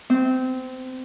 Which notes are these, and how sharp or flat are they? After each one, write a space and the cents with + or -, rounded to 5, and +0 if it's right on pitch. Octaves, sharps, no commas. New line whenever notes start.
C4 -20